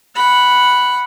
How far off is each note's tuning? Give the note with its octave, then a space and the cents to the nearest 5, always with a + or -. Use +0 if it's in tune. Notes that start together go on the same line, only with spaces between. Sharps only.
F#5 +0 B5 +0